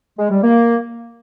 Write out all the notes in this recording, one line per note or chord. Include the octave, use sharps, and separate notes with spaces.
G#3
G3
A#3